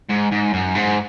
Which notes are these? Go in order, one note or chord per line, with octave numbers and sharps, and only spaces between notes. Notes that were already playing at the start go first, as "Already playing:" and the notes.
G#2
G#2
F#2
G#2